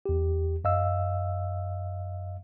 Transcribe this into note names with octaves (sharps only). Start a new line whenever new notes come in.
E2 G4
F#2 D#5 F5 E6